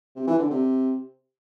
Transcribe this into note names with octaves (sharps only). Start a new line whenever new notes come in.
C3
E3
D3
C3